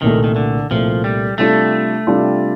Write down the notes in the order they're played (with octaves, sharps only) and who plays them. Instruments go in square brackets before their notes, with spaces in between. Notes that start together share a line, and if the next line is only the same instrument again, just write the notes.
[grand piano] C2 A#2 A3 [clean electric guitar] D#3
[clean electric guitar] D#3
D3
[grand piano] C2 A#2 A3 [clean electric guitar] F3
[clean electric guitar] G3
[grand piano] C3 G3 D4 F4 A4 [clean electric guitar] A3
[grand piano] C3 G3 D4 F4 A4